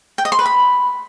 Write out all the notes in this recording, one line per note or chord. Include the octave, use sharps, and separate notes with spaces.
G5
D#5
C6
B4
B5